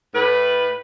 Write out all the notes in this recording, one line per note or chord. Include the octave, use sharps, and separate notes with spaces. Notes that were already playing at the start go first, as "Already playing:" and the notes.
A2 B4